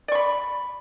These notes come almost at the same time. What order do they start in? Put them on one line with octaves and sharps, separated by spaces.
D5 C#6 B5